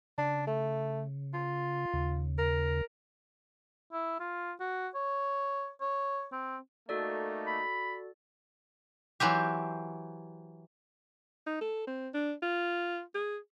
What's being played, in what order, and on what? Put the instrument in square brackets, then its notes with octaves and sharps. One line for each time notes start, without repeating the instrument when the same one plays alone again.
[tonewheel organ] C#3 [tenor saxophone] D4
[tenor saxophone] A3
F4
[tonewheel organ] D#2 C#3
[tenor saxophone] A#4
[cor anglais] E4
F4
F#4
C#5
C#5
C4
[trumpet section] A3 A#3 D#4 [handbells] F#4 A4 D5
[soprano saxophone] B5
[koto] E3 F#3 C4 G4
[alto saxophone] D#4
A4
C4
D4
F4
G#4